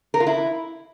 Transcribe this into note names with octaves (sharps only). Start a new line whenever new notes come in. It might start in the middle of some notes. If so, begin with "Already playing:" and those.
A#4
F4
E4